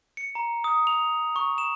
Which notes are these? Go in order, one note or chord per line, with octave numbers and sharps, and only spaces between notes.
C#7
A#5
D#6
F7
C#6
E7